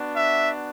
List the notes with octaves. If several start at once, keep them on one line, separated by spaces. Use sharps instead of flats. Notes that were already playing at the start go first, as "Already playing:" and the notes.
Already playing: B3 D4 F#4
E5